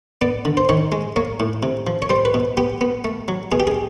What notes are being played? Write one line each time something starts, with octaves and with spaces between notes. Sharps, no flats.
B3 D5
D3
C5
D#3 C#5
G#3
A#3 C#5
A2
C3
F3
C#5
G3 C5
B4
B2
B3 G4
B3
A3
F#3
B2 G#4
G4
G#4